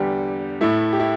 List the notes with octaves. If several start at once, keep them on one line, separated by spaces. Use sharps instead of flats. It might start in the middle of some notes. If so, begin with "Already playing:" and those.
Already playing: E2 D3 G3 G4
A2 A3 E4
G4
E4